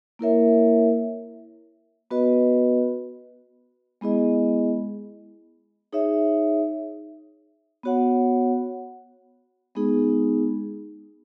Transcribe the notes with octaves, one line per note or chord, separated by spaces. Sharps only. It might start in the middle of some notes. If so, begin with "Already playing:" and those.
A#3 E4 A#4 C#5 E5
B3 F#4 B4 D#5
G#3 B3 E4 G#4 D#5
D#4 G#4 C#5 E5
B3 F#4 C#5 F#5
G#3 B3 D#4 G#4